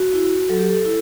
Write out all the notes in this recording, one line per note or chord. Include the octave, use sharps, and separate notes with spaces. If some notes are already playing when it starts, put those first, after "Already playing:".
Already playing: F#4
E4
F#3 A4
G4
A4
E4